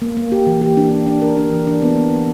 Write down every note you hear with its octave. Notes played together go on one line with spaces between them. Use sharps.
A#3
A#3
G4
E3
G4
D4
E3
D4
A#4
D4
E3
D4
B3
B3
E3